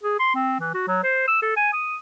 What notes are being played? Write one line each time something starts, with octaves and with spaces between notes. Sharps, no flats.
G#4
C6
C4
E3
F#4
F#3
C5
E6
A4
G#5
D#6